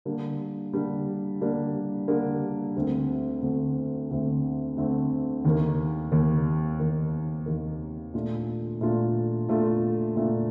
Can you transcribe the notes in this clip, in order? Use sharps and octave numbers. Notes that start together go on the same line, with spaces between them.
D3 G3 A#3 D4
D3 G3 A#3 D4
D3 G3 A#3 D4
D3 G3 A#3 D4
D2 D3 A3 C4
D2 D3 A3 C4
D2 D3 A3 C4
D2 D3 A3 C4
D#2 D#3 A#3
D#2 D#3 A#3
D#2 D#3 A#3
D#2 D#3 A#3
A#2 A3 D4 F4
A#2 A3 D4 F4
A#2 A3 D4 F4
A#2 A3 D4 F4